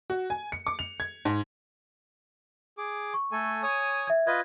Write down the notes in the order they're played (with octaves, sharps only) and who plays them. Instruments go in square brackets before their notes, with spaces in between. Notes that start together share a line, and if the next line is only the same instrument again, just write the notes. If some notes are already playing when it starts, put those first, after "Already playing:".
[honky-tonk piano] F#4
G#5
C#7
D6
F7
G#6
G#2
[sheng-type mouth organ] G#4 D6
[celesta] C#6
[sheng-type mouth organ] A3 A4 G#5
C#5 G#5 D#6
[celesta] E5 G#6
[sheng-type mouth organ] F4 B4 D#5 [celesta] G#6